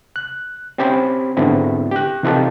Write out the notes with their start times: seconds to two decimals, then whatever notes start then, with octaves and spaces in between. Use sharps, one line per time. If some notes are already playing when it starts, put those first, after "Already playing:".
0.16 F#6
0.78 C4 C#4 G4 C5 B5
1.37 G#2 D3 B3 C4 E4
1.92 G4 F#6
2.23 C3 E3 D#4 F4 G4 A4